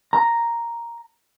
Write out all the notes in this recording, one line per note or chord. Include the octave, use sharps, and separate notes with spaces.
A#5